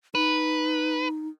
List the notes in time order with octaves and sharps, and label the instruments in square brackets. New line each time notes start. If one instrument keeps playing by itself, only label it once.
[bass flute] D#4 [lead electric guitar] B4